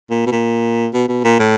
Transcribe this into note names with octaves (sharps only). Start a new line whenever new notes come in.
A#2
B2
A#2
B2
B2
A#2
A2